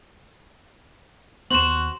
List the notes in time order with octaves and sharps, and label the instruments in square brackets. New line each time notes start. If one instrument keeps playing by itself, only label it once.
[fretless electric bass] D#2 B3 [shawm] F#4 [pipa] C5 [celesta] E7 F#7